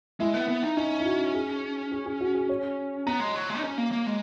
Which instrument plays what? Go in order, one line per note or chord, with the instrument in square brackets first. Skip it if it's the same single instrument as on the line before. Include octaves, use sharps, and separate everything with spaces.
[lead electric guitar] G#3 [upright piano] E4
[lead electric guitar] B3
B3
D#4
[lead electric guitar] C#4 [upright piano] D#4
[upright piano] E4
F#4
G#4
G#4
G#4
F#4
G#4
C#5
[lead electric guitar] B3 [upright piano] A#5
[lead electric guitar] G#3
F#3
G#3
D#4
C#4
A#3
A#3
G#3